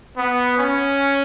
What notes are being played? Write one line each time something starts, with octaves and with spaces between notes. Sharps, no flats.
B3
C#4